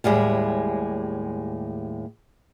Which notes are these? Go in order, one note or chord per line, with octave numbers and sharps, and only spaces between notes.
D#2 A2 G3 G#3